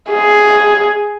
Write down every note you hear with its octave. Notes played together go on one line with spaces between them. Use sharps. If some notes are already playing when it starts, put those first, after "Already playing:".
G#4